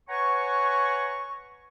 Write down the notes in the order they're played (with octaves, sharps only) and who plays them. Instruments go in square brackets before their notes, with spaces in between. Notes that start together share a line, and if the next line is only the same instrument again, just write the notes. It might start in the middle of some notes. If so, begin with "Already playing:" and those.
[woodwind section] B4 C#5 F#5 G#5 A#5 C#6